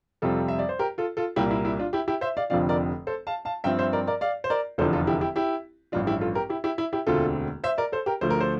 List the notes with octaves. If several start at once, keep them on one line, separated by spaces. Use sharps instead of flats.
F2 C3 G3 C4 F4 A4
E5
D5
C5
G4 A#4
F4 A4
F4 A4
C2 A#2 G3 A#3 E4 G4
E4
E4
D4 F4
E4 G4
E4 G4
C5 E5
D5 F5
F1 F2 D3 F3 C4 D5 F5
A#4 D5
A4 C5
F5 A5
F5 A5
G2 F3 C4 E5 G5
C5 E5
A#4 D5
A#4 D5
D5 F5
C5
A#4 D5
F1 E2 D3 F3 A4 C5
F4 A4
E4 G4
E4 G4
E4 G4
A1 G2 F3 D4 F4
E4 G4
F4 A4
G4 A#4
E4 G4
E4 G4
E4
E4 G4
E1 D2 D3 A3 C4 F4 A4
C5 E5
A#4 D5
A4 C5
G4 A#4
D2 D3 F3 A3 C5
A#4
A4 C5